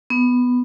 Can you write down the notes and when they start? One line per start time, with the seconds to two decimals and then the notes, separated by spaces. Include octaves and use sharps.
0.10 B3